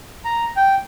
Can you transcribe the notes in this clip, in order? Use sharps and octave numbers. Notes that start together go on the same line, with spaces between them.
A#5
G5